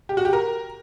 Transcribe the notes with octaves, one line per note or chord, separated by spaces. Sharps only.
G4
F#4
G4
A#4